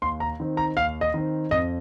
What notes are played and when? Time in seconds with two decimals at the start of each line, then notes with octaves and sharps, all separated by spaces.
0.02 D#2 C6
0.20 A#5
0.40 D#3 C4
0.57 A#5
0.77 D#2 F5
1.01 D#5
1.14 D#3 C4
1.51 F2 D#5